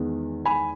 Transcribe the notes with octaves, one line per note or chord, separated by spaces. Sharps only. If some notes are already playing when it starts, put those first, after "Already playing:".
Already playing: E2 D#3 G#3 B3
G#5 B5